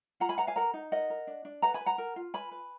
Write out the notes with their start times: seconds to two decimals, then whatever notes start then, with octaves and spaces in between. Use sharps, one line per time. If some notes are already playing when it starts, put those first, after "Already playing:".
0.20 F4 F#5 A#5
0.29 G#5 B5
0.38 B4 F#5 A#5
0.47 F5 G#5
0.56 A#4 F#5 A#5
0.74 D#4
0.91 A#4 D#5 F#5
1.10 A#4
1.27 D4
1.45 D4
1.62 B4 F#5 A#5
1.74 G#5 B5
1.81 B4
1.86 F#5 A#5
1.98 A#4
2.16 F4
2.34 B4 G#5 B5
2.51 B4